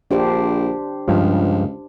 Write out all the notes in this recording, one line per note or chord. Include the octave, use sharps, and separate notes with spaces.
A#1 D4 G4 C5
C#2 G2 F3